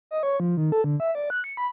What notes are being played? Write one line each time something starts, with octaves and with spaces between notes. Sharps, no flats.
D#5
C#5
F3
D#3
A4
D3
E5
D5
F#6
C#7
B5